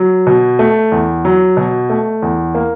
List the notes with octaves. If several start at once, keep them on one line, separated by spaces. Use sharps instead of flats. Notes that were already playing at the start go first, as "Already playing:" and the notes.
Already playing: F#3
B2
A3
E2
F#3
B2
A3
E2
A#3